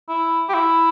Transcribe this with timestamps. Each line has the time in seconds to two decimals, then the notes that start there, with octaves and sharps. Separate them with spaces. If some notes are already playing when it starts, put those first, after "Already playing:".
0.09 E4
0.49 G4
0.54 E4